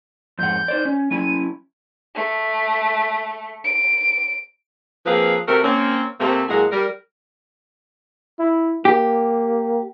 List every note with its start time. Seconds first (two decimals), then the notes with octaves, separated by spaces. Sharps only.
0.39 F2 G#2 F#5 G6
0.68 D#4 C5 D5
0.85 C#4
1.11 F#3 C#4 E4 D#7
2.15 A3
3.64 D7
5.06 F3 A#3 C4 G#4 B4 F5
5.48 C3 A3 C4 F#4 A#4
5.64 A#3 C4 C#4
6.20 C3 A3 A#3 C4
6.49 A2 F#3 G#3 A#3 G#4 F#5
6.72 G3 A#4
8.39 E4
8.85 A#3 G4